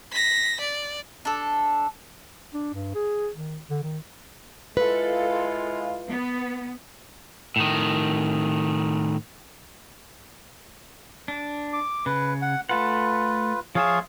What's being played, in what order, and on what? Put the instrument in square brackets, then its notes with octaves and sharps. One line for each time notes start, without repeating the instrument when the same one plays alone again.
[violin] A#6 B6
D5
[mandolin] D4 A4
[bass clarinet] D4
G2
G#4
D#3
D3
D#3
[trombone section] G#3 E4 F4 [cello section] A4 [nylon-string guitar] B4
[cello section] B3
[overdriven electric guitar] A2 D#3
[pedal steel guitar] D4
[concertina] D6
[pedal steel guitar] C#3 [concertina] B4
[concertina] F#5
[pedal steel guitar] A3 A4 F#5 [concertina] F4 B4
[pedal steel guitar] F3 F4 E5 [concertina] G#4 C#5 F5